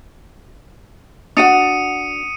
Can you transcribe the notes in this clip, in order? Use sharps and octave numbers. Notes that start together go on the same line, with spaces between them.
D4 F#4 F#5 D#6 C#7 D#7